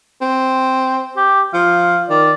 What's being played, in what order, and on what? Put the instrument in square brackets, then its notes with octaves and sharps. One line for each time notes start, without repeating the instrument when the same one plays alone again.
[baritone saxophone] C4
[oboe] G4
[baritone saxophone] F3 [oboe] F5
[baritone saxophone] D#3 [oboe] D5